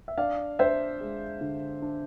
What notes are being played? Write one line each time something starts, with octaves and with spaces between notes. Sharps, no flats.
E5
D4 D5 F5
D4 C5 E5
G#3
D3
D4